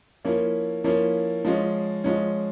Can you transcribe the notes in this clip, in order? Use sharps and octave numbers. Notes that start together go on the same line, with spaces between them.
F3 A#3 C#4 E4
F3 A#3 C#4 E4
F3 G#3 C#4
F3 G#3 C#4